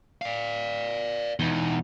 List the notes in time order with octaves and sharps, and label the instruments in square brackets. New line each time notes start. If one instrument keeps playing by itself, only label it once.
[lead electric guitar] D5 F5
[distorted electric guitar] E2 B2 [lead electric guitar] D#4